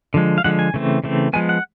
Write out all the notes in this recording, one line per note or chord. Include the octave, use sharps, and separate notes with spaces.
D3 F3 G#3
F5
D3 F3 G#3 F#5
G#5
C#3 E3 A3 C4
C#3 E3 A3 C4
F3 G#3 B3 G#5
F#5